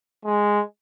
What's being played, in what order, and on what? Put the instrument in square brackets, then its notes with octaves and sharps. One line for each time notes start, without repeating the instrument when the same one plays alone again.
[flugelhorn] G#3